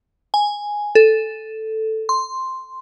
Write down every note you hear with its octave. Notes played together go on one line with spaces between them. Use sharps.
G#5
A4
C6